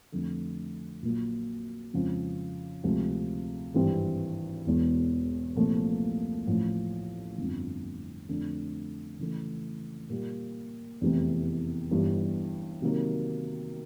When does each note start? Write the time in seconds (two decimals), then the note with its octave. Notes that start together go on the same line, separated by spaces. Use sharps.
0.12 F2 D3 F3 A3
1.02 A#1 A#2 F#3
1.93 F2 C#3 F3 G#3 C4
2.84 D2 C3 F3 G#3
3.74 G#1 G2 E3 G3 C4
4.66 E1 E2 B2
5.56 C2 A#2 F3 A3
6.47 A1 A2 F3
7.38 G1 F2 D3
8.29 F2 D3 F3 A3 D4
9.19 C#3 E3 A3
10.10 A#2 G3 A#3
11.01 F1 E2 C3 E3
11.91 G1 G2 E3 G3
12.82 C3 D#3 F#3 A#3